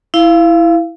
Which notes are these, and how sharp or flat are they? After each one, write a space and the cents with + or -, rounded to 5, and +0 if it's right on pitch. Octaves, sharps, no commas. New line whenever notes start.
E4 +0 F5 -20